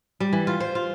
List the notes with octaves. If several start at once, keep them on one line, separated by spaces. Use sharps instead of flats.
G3
E3
F4
C5
F4